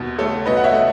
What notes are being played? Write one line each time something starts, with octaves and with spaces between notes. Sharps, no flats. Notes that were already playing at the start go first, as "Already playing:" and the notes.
Already playing: D#2 B2
A3 A4 C#5
B2 B4 D#5
F#5
C#5 E5
A3